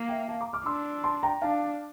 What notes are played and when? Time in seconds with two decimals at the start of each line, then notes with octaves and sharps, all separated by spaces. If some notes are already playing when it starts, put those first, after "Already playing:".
Already playing: A#3
0.09 E5 G5
0.28 F5 A5
0.41 A#5 D6
0.53 D6 F6
0.66 D4 C6 E6
1.04 A5 C6
1.23 G5 A#5
1.42 D4 F5 A5